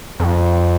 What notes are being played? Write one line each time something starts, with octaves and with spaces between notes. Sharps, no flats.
F2